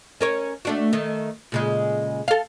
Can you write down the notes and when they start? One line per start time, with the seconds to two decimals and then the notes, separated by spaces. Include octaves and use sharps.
0.21 C#4 A#4 C#5
0.65 A3 D4 F#4
0.93 D#3 A3
1.52 A#2 C#3 G#3
2.28 A4 F5